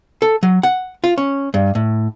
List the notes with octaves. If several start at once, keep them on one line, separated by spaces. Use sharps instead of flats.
A4
F#3
F#5
F4
C#4
G2
A2